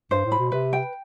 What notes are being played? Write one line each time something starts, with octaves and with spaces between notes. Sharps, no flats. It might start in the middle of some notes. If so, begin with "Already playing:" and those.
G2 C5
A2
B5
B2
C3 B4
G5